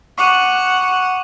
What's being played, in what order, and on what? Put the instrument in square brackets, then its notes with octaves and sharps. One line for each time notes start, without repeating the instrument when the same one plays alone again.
[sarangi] F#5 [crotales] C#6 D6 D#7